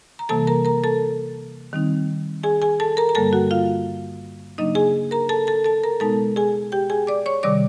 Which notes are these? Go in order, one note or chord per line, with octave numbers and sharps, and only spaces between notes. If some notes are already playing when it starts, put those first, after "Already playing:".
A#5
C3 E3 G3 A#3 A4 A5
A#4 A#5
A#4 A#5
A4 A5
D#3 G3 C4 D#4
G#4 G#5
G#4 G#5
A4 A5
A#4 A#5
A#5
G2 D3 G3 A#3 A4 A5
F#4 F#5
F4 F5
C#3 F#3 A#3 D4 D#4 D#5
G#4 G#5
A#4 A#5
A4 A5
A4 A5
A4 A5
A#4 A#5
B2 G#3 B3 D#4 A4 A5
G#4 G#5
G4 G5
G#4 G#5
D5 D6
C#5 C#6
C3 D#3 G3 D5 D6